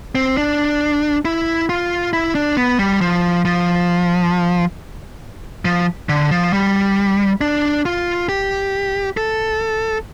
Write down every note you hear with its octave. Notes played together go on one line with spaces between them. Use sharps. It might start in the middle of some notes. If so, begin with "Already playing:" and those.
C4
D4
E4
F4
E4
D4
B3
G3
F3
F3
F3
D3
F3
G3
D4
F4
G4
A4